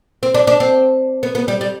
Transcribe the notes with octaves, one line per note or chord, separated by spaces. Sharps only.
C4
D4
D4
C4
B3
B3
G3
G3